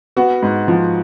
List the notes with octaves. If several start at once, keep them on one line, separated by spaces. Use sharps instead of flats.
B3 F#4
G#2
F3